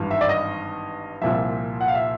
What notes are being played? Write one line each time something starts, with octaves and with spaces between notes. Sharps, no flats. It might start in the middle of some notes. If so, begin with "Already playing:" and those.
Already playing: G#1 G2 E3
E5
D5
D#5
C2 A#2 F3 E5
F#5
F5
E5